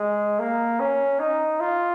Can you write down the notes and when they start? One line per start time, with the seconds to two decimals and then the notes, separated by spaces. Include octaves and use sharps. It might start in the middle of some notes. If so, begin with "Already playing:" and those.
Already playing: G#3
0.39 A#3
0.80 C#4
1.20 D#4
1.60 F4